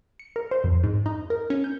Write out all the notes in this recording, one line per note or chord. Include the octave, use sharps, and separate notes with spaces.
C#7
A#4
C5
F2
G#2
D#4
A#4
C#4
G6